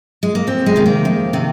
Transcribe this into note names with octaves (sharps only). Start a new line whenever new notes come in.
G#3
A#3
F2 C4
G#3
C3 D#3
A#3
F2
C3 D#3